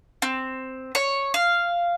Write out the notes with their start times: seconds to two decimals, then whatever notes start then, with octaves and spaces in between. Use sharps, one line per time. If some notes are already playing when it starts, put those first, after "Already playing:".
0.22 C4
0.95 C#5
1.34 F5